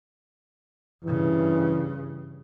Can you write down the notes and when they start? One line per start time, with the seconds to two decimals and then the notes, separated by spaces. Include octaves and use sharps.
1.04 G2 C#3 E3